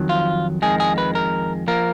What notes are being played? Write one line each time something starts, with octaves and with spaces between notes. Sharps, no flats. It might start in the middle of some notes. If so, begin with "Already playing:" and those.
Already playing: F2 D#3 F#3
F4
F2 D#3 G#3 G#4
G#4
B4
A#4
F3 A#3 A#4